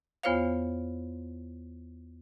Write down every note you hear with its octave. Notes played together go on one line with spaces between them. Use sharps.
E2 B3 F4 C5 C#5 F5